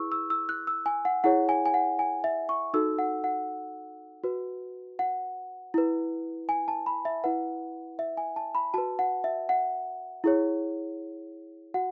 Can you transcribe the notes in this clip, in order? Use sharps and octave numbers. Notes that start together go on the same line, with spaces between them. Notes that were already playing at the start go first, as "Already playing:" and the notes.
Already playing: E4 G#4 B4 C#6 E6
E6
E6
F#6
E6
G#5
F#5
E4 G#4 C#5 F#5
G#5
G#5
F#5
G#5
E5
C#6
D#4 F#4 A4 E6
F#5
F#5
F#4 B4
F#5
E4 B4
G#5
A5
B5
E5
E4 B4 F#5
E5
G#5
A5
B5
F#4 B4 A5
F#5
E5
F#5
E4 G#4 C#5
F#4 F#5